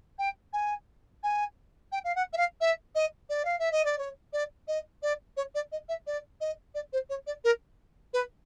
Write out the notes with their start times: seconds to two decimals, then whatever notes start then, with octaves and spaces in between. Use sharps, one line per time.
0.18 G5
0.53 G#5
1.23 G#5
1.92 G5
2.04 F5
2.15 F#5
2.33 E5
2.37 F5
2.61 E5
2.95 D#5
3.29 D5
3.45 F5
3.59 E5
3.72 D#5
3.85 D5
3.98 C#5
4.33 D5
4.68 D#5
5.02 D5
5.37 C#5
5.55 D5
5.72 D#5
5.89 E5
6.07 D5
6.41 D#5
6.75 D5
6.93 C5
7.09 C#5
7.27 D5
7.44 A#4
8.13 B4